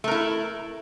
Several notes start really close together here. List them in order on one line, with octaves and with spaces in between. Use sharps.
A3 A#4 E4